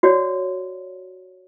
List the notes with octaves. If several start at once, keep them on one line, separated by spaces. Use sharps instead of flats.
F#4 C#5 D5